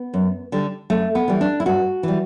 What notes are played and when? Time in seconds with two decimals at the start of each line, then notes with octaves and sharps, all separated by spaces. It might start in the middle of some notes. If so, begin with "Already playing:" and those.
Already playing: B3
0.14 F#2
0.52 D3 G3
0.90 F#2 A3
1.15 B3
1.28 E3 G3
1.41 D4
1.60 E4
1.66 G2 F#4
2.03 E3 G3